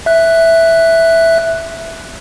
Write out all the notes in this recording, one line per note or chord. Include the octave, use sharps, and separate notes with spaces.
E5 F#6